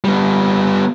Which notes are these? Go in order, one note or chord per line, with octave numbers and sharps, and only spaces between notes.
G3 B3